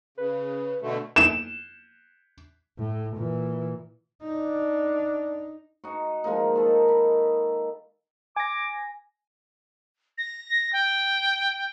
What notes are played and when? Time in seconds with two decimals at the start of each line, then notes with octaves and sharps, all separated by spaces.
0.18 C#3 B4
0.81 B2 D3 A3
1.16 E7
2.78 A2
3.16 A#2 E3
4.23 D4 D#4
5.84 D#4 F#4
6.24 F3 G#3 A#3 D#4
6.55 D#3 A4
6.88 B5
8.36 G#5 D6 A#6
10.18 A#6
10.73 G5